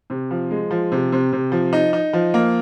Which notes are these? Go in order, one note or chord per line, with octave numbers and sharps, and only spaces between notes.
C3
F3
G#3
F3
C3
C3
C3
F3
D#4
D#4
F3
A#3